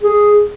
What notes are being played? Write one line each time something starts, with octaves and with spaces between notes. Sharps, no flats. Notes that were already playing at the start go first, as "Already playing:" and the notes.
G#4